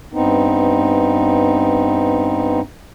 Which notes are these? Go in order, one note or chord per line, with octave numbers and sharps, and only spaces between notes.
G2 B3 C4 D#4